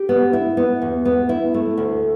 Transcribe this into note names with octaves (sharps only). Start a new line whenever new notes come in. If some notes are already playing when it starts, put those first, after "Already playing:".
Already playing: G4
B3
E4
B3
E2
B3
E4
A3
D2